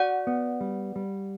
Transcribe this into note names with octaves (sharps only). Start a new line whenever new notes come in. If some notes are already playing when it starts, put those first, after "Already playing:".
Already playing: F#4 D5 F#5
B3
G3
G3